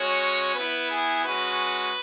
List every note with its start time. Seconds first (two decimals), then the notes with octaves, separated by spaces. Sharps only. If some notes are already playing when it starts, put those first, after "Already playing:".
Already playing: G#3 C#4 F#4 C#5
0.55 B3 E4 B4
0.90 G#4
1.24 G#3 C#4 F#4 B4